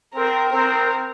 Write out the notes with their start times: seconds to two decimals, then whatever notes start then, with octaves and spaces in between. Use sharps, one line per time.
0.14 C4 A#4
0.52 C4 A#4